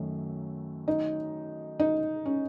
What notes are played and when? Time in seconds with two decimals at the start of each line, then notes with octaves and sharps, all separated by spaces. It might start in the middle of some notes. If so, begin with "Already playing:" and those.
Already playing: F#2 D#3 F#3 A3
0.88 D#4
1.80 D#4
2.26 C#4